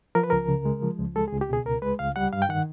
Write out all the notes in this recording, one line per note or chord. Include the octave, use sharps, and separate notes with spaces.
F3 A#4
B4
C#2 A#4
C#3
G#3
F3
C#2
G#3 A4
G#4
C#2
G4
B2 G#4
C#2 A#4
G#3 B4
C#2 F5
G3 F#5
G2 F5
G5
D#3 F#5